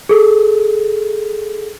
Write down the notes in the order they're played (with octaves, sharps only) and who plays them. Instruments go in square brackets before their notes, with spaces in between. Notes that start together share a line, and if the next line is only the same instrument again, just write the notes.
[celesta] G#4 A4